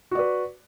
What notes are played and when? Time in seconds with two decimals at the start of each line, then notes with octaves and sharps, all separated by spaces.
0.11 F#4
0.15 D5
0.19 B4